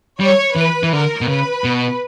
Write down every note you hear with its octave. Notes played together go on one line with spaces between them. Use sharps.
G3 C#5
E3 B4
E3
D3 A#4
B2
C#3 B4
B2